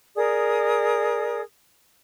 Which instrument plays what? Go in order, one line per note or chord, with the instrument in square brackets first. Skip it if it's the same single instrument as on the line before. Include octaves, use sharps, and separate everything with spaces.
[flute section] G#4 A#4 D5 D#6